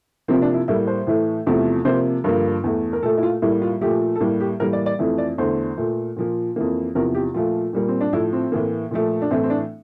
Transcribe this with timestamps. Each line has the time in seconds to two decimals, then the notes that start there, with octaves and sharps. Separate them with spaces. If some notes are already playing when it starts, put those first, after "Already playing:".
0.28 C3 F3 A#3 C4
0.42 D4
0.54 E4
0.68 A2 G3 A#3 E4
0.87 C5
1.07 A2 E3 A3
1.47 E2 C3 F3 A3
1.85 C3 F3 A#3 C5
2.24 G2 D3 F3 A#3 A#4
2.64 E2 E3 A3
2.93 A#4
3.03 A#2 A3 A4
3.18 E4
3.23 F4
3.42 A2 G3 A#3 E4
3.62 F4
3.81 A#2 F3 A3 G4
4.16 A4
4.21 A2 G3 A#3 G4
4.40 G4
4.60 A2 E3 G3 A#3 A#4
4.73 D5
4.86 D5
4.99 F2 E3 A3
5.18 D5
5.38 E2 D3 A3 C5
5.78 A#2 A3
6.17 A#2 F3 A#3
6.56 F2 E3 A#3
6.95 E2 C3 F3 A#4
7.15 G4
7.34 A#2 F3 A3 F4
7.73 A#2 G3 A#3
7.89 C4
8.01 D4
8.13 A2 F3 A3 E4
8.33 C4
8.52 A2 E3 A#3
8.91 A#2 F3 A3
9.22 D4
9.31 A2 E3 A3 C4
9.43 C4
9.50 D4